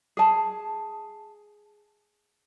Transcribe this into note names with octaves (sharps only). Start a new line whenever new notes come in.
G#4 A5